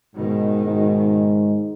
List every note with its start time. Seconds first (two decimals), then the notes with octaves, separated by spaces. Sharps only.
0.15 G#2 B2 D#3
0.66 G#2